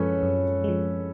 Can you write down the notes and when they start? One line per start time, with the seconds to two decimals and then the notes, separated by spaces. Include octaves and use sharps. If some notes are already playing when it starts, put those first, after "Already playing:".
Already playing: F#2 F3 G#3 C#4 A4 B4 C#5
0.23 F#2
0.64 F3 G#3